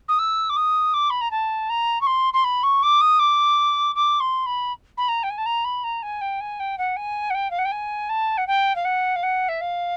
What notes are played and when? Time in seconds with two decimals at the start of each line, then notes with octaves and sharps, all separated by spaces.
0.09 D#6
0.19 E6
0.50 D6
0.56 D#6
0.94 D6
1.10 B5
1.21 A#5
1.31 A5
1.70 A#5
2.01 C#6
2.07 C6
2.34 C6
2.44 B5
2.63 C#6
2.83 D6
3.01 D#6
3.19 D6
3.96 D6
4.20 C6
4.46 B5
4.98 B5
5.08 A#5
5.23 G5
5.30 G#5
5.38 A5
5.46 A#5
5.65 B5
5.84 A#5
6.03 G#5
6.21 G5
6.41 G#5
6.60 G5
6.78 F#5
6.97 G#5
7.30 F#5
7.35 G5
7.51 F5
7.59 F#5
7.65 G5
7.72 G#5
8.09 A5
8.38 F#5
8.47 G5
8.76 F5
8.85 F#5
9.16 F5
9.23 F#5
9.49 E5
9.61 F5